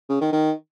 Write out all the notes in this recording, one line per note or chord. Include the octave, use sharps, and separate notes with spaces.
C#3
D#3
D#3